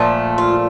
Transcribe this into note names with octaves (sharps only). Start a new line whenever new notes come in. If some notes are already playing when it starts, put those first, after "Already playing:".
Already playing: A#2 F3 A3
F4